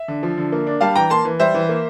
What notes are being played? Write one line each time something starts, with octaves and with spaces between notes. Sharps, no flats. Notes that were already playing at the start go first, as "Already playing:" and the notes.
Already playing: E5
D3
F3
D3
A#3
D4
G3 F5 A5
E3 G5 A#5
A#3 A5 C6
E3
G3 C5 E5
E3
A#3